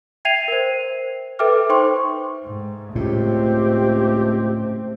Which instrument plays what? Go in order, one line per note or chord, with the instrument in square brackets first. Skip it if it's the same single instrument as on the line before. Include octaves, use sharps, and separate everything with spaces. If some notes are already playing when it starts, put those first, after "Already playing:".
[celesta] E5 G5 G#6 C7 D#7 F7
A#4 C5
A4 B4 E5 G5 D6 F6
D#4 C5 G5 C6 C#6
[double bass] G#2
[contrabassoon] C#2 [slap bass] A2 [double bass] A3 C4 [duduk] G4